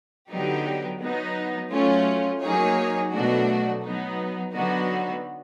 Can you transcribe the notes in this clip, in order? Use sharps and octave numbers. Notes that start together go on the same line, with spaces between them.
D3 F#3 B3 D#4 G4
F#3 B3 D#4
F#3 A3 C#4 F4
F#3 A#3 D#4 G#4 C#5
B2 F#3 A3 D4 F#4
F#3 B3 D#4
D3 F#3 B3 D#4 F#4